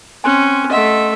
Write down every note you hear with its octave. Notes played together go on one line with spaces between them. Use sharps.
C4 C#4 G#5 C6 F#6
A3 D#5 E5 F#5 C6